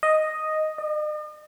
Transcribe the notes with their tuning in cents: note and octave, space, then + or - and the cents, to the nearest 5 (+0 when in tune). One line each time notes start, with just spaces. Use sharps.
D#5 +0
D#5 -45